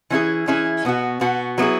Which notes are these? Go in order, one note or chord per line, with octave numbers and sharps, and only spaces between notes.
E3 C#4 E4 G#4
E3 C#4 E4 G#4
B2 B3 F#4
B2 B3 F#4
F#3 B3 E4 G#4